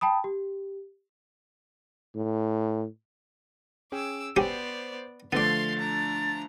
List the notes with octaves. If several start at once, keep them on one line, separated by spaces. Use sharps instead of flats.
G5 A5 B5 D#6
G4
A2
C#4 G#4 G5 D6 E6
F#3 B3 C#4 G4 C5 D5
D3 F3 A3 B3 D5 F5 C6 A6
D4 A#5